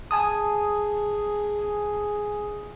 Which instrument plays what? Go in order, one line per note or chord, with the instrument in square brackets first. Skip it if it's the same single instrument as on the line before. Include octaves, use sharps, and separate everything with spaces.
[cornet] G#4 [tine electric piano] G#5 A5 D#6